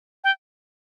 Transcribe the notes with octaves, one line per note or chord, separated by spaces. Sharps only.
G5